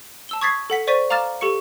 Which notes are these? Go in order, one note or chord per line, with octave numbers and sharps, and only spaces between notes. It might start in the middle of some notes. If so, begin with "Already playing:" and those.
A5 E6 G7
C#6 D#6 G#6 A6 B6 C7
A4 F#5 B6
C5 D5 C#6 A6 B6 D#7
F5 A#5 D6 F6 A6 E7
G4 A4 C#6 C#7